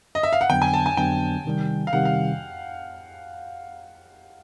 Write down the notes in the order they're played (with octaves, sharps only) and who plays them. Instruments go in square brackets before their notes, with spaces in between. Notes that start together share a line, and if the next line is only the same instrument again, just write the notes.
[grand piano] D#5
E5
F5
F#5
[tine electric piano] F2 D3 F#3 B3 D4 [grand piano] G5
[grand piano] G#5
A5
G#5
[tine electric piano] F2 D3 F#3 B3 D4 [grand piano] G5
[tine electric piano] C3 D#3 G3
[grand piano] F5
[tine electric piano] C3 D#3 G3 [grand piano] F#5
[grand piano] F5